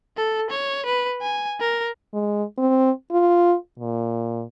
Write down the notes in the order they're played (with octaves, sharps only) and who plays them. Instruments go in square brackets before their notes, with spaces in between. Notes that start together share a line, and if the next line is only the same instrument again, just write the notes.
[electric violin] A4
C#5
B4
G#5
A#4
[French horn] G#3
C4
F4
A#2